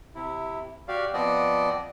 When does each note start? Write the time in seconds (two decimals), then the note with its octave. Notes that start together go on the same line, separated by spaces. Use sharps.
0.15 C3 E4
0.88 F#4 G4 D5 F5
1.14 F3 B3 C4 D5 D#5